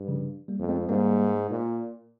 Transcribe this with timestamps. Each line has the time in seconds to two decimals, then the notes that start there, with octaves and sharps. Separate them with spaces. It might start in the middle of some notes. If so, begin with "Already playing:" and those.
Already playing: G2
0.08 C#3 F3
0.48 G3 A#3
0.59 F2
0.69 G#3 C4
0.89 G#2 G3 A#3
1.51 A#2